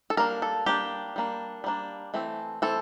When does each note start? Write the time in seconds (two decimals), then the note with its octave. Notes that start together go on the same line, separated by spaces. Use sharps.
0.10 A4
0.17 G3 A#3 D4 A#4
0.42 A4
0.66 G3 A#3 D4 G4
1.16 G3 A#3 D4
1.64 G3 A#3 D4
2.14 E3 A3 C4
2.62 E3 A3 C4 A4